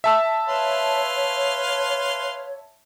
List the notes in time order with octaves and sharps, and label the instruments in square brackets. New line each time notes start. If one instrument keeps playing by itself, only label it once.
[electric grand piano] E5 A5 E6
[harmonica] B4 F5 C6 [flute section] C#5